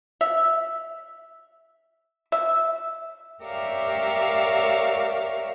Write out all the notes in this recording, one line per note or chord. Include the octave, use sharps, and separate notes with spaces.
E5
E5
G4 A#4 C#5 D5 E5 F5